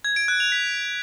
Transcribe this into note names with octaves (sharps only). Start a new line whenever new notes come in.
G#6
D7
F#6
F7
B6